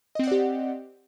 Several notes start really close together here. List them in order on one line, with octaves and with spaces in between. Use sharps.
D#5 C4 F#5 D5 G4